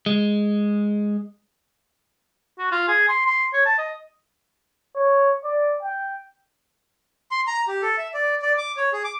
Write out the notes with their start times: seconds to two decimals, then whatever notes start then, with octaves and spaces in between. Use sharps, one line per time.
0.06 G#3
2.59 F#4
2.72 F4
2.88 G#4
3.08 C6
3.26 C6
3.53 C#5
3.66 A5
3.78 D#5
4.96 C#5
5.44 D5
5.83 G5
7.31 C6
7.47 A#5
7.68 G4
7.82 A4
7.98 E5
8.14 D5
8.42 D5
8.58 D6
8.77 C#5
8.93 G#4
9.04 D6